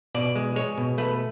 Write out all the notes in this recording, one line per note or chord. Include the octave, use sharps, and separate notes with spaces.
B2 D5
G#3
G#3 C#5
B2
A3 B4